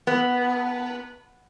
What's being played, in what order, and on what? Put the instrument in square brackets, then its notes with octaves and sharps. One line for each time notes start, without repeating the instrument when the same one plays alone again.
[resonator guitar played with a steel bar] B3